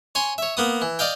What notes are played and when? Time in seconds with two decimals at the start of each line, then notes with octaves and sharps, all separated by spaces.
0.15 C#5 G#5 C6
0.38 C#5 E5
0.57 A#3 B3 D#6
0.82 E3
0.99 D5 D#5 F5 G5